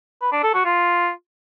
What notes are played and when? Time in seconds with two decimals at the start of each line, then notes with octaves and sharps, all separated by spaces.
0.21 B4
0.32 D4
0.43 A4
0.54 F#4
0.65 F4